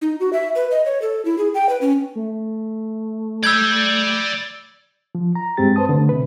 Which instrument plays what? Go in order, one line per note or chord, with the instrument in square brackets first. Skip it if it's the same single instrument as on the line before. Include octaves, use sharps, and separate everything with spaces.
[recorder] D#4
F#4
E5
B4
D#5
C#5
A4
E4
G#4
G5
B4
C#4
[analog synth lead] A3
[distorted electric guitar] D5 B5 [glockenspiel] E6 G6 G#6
[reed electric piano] F3
A#5
G2 G#3 C4 G4 A6
B4 C5 A5 D#6
D3 A3
C3 B4